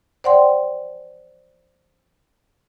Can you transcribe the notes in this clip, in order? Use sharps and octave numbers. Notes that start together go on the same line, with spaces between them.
C5 D5 F#5 G5 C6